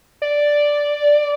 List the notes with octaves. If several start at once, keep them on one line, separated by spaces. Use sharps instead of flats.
D5